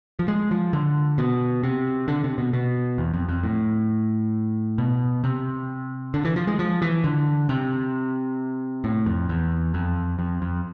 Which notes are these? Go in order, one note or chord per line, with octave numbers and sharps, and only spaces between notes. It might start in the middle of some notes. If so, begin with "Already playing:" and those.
F3
G#3
F3
D3
B2
C3
D3
C3
B2
B2
E2
F2
F2
A2
B2
C3
D3
E3
F3
G#3
F3
E3
D3
C3
A2
F2
E2
F2
F2
F2